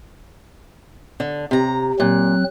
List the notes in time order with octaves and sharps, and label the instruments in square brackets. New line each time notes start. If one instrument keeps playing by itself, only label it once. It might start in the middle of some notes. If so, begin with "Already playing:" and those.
[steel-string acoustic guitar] D3
C3 A#5
[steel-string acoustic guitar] A#2 [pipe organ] F#3 C4 F#6